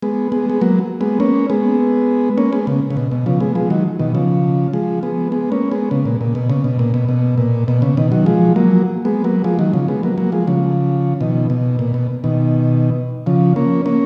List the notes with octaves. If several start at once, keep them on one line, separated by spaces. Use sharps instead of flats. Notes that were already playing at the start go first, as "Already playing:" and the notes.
G#3 B3
G#3 B3
G#3
F#3 A#3
G#3 B3
A#3 C#4
G#3 B3
A#3 C#4
G#3 B3
C#3
C#3
B2
B2
C#3 F3
G#3 B3
F3 G#3
D#3 F#3
B2 D#3
C#3 F3
F3 G#3
G#3 B3
G#3 B3
A#3 C#4
G#3 B3
C#3
A#2
A#2
B2
C#3
B2
A#2
B2
B2
A#2
B2
C#3
B2 D#3
D#3 F#3
F3 G#3
F#3 A#3
G#3 B3
F#3 A#3
F3 G#3
D#3 F#3
C#3 F3
G#3 B3
F#3 A#3
F#3 A#3
F3 G#3
C#3 F3
B2 D#3
B2
A#2
B2
B2 D#3
C#3 F3
A#3 C#4
A#3 C#4